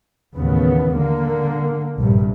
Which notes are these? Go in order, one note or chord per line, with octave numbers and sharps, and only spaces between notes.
A1 D#2 C#3 B3
D3 A#3
A#1 G2 C3